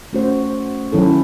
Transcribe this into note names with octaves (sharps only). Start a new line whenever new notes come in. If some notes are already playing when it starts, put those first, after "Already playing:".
A3 C#4 F#4 C5
D#3 F#3 C#4 E4 A4